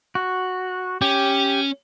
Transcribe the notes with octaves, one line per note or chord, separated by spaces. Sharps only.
F#4
C#4 G4